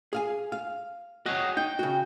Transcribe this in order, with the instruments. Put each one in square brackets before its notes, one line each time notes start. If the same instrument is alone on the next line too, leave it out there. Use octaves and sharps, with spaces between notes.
[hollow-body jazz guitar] G#4 F5 G#5
F5
[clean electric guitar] F#4 G#4 C#5 [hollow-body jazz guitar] D#5
[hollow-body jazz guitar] D#4 [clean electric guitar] G5
[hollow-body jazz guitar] C#3 F#4